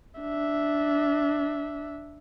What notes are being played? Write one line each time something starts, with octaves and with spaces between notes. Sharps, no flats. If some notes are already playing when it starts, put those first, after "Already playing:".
D4 E5